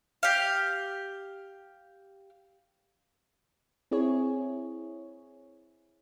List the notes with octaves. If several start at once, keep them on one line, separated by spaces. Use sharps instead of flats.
G4 F5
C4 E4 G#4 C#5